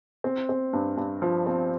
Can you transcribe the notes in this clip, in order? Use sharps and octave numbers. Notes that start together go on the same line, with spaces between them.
C4
C4
G2
G2
F3
C4